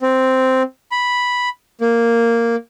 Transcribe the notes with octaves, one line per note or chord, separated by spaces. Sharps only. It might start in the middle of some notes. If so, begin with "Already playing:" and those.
C4
B5
A#3